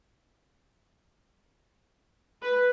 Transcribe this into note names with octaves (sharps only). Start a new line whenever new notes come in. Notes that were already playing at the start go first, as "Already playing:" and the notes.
B4